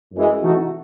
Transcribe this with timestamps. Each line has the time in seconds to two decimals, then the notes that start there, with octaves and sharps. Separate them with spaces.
0.12 F#2 E3 G#3
0.41 C3 E3 A3 D#4 F#4